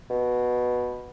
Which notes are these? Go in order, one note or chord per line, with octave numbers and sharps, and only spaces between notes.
B2